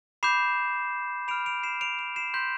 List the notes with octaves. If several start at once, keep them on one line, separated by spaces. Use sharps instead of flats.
B5 D6 G6 C7 E7
B5 F6 D7 F7
D7 F7
C7 E7
D7 F7
D7 F7
C7 E7
C6 G6 B6